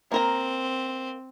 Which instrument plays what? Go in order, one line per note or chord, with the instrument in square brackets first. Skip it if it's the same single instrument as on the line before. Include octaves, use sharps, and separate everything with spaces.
[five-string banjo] A#3 A#4 A#5 [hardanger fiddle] C4